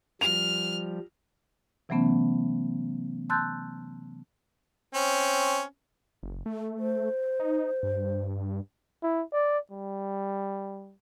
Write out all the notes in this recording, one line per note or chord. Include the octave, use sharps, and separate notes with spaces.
F3 G3 F6 F7
C3 E3 F#3 A3 B3 C#4
A5 C6 E6 F#6 G6 A6
C4 C#4
F#1
A3
C5
D#4
G2
E4
D5
G3